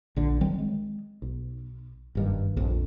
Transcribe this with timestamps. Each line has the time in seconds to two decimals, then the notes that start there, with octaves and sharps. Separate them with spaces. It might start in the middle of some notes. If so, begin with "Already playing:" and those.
0.16 A#1 D3
0.41 D#3 F#3 G3 C4
0.58 G#3
1.22 B1
2.15 F#1 G2 D#3
2.56 A#1 F2